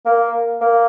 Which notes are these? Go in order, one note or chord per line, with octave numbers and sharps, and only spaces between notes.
A#3
A#3